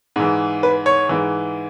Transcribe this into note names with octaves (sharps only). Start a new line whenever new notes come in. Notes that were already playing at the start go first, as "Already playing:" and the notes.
G#2 E3
B4
C#5
G#2 E3